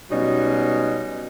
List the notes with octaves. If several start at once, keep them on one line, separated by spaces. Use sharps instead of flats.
B2 F#3 G3 C#4 D#4